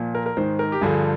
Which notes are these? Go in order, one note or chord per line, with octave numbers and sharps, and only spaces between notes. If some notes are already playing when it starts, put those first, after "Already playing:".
Already playing: A#2 F3
A#4
A#4
G#2 D#3 C5
A#4
G4
G2 D3 F3 G#4